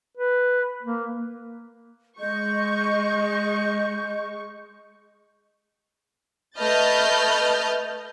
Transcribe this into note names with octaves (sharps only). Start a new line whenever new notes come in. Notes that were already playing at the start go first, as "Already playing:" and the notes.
B4
A#3
G#3 D#5 C#6 G6
A3 B4 D#5 F6 G6 A6